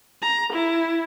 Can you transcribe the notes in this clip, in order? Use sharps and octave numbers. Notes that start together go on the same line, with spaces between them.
A#5
E4